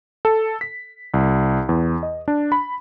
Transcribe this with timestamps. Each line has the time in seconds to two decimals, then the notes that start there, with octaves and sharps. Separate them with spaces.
0.25 A4
0.61 B6
1.14 C2
1.69 E2
2.03 D#5
2.28 D4
2.52 B5